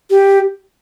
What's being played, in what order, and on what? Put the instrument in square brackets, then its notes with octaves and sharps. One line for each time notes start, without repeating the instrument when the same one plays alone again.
[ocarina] G4